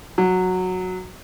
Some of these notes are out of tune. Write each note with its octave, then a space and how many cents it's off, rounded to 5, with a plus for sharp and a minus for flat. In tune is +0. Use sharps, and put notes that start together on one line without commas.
F#3 -10